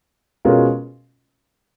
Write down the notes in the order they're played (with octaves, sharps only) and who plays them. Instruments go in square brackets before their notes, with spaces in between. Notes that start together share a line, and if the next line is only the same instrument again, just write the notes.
[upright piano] B2 G#3 C#4 F4 A#4